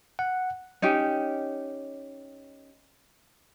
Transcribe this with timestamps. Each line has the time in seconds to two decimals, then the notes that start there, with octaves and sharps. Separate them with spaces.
0.19 F#5
0.82 C#4 D#4 G4